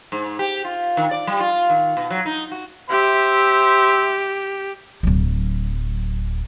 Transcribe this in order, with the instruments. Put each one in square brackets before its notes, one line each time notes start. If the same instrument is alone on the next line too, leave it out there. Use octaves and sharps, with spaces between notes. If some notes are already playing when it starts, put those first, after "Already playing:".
[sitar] G#2
G4
F4
D#3
D5
G3
F4
D#3
B2
F#3
D#4
F#4
[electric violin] G4 [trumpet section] C5 E5
[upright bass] D1 F#3